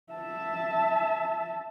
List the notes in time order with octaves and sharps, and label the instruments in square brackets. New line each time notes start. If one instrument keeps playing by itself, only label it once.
[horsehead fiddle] E5 A5